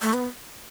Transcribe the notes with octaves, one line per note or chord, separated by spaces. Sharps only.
A3
B3